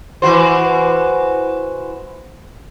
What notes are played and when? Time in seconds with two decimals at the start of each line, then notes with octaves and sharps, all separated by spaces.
0.22 E3 F#4 C5